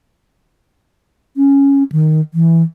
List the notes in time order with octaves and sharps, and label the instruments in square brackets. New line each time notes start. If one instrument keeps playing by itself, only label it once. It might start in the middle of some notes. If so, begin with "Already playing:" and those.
[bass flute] C#4
D#3
E3